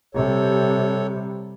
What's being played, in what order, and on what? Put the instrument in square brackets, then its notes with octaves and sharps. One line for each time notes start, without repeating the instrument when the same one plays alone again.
[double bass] C3 G3 [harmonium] A4 C#5